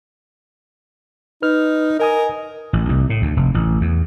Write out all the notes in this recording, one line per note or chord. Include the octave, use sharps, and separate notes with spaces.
D#4 B4 F6
A#4 D#5 G#5 D#6
A1
C2
A2
D2
F1
A1
E2